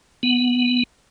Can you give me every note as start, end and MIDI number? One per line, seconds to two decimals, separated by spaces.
0.23 0.83 59